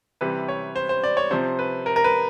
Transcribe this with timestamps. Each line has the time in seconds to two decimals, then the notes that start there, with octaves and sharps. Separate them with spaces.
0.21 C3 E3 G3 B4
0.48 C#5
0.76 C5
0.89 C5
1.03 D5
1.17 C#5
1.31 C3 F3 C5
1.59 B4
1.86 A#4
1.96 A#4
2.04 B4